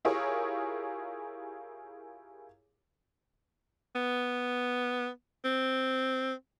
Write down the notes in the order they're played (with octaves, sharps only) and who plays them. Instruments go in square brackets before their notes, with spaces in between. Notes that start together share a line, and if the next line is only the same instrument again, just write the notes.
[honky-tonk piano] E4 F4 G4 G#4 A#4 C#5
[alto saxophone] B3
C4